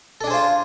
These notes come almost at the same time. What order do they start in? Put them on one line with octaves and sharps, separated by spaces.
A4 D4 G#4 C5 F4